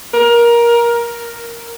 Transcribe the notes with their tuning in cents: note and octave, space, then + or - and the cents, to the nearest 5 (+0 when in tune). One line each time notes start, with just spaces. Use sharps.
A#4 +20
A#4 +0